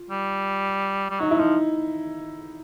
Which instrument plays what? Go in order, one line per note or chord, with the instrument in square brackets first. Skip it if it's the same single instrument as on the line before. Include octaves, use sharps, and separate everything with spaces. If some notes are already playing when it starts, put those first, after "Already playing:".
Already playing: [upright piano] F4
[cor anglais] G3
G3
[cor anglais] F#3 [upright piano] D#4
[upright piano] E4
[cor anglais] F3 [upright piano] D#4